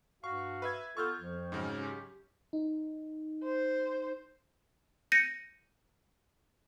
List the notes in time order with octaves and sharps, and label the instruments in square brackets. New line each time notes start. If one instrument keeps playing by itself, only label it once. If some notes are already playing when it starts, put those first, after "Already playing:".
[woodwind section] G2 F#4 F5 [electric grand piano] C#6
[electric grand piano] B4 E5 G#6
[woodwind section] B3 F4 A4 [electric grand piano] C#6 F6 G6
[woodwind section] F2 F3
[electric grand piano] G#2 C#3 F#3
[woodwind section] C#4 G4
[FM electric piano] D#4
[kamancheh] C5
[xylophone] G6 A6 A#6 C#7 D#7